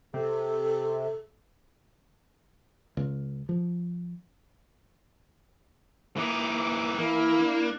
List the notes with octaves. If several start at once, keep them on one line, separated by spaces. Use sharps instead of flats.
C3 A4
C#2
F3
E3 A#3 D#4 D6
E3 A#3 E4 A#4
D4